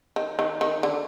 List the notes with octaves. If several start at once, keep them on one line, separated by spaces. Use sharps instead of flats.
D#3
D#3
D#3
D3